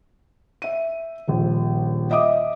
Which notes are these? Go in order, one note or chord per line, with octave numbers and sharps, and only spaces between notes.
E5 D#7
D#1 A#1
D#5 E5 D6 D#6